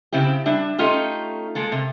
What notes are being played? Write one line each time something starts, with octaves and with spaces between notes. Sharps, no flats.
C#3 C4 E4 G4
G3 D4 E5
A3 C#4 D#4 F4 G4
G#3 A#3 A4
C3